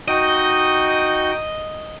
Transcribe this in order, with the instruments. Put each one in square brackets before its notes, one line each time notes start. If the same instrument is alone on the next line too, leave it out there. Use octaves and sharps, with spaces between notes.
[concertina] D#4 F#4 G5 [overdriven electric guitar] D#5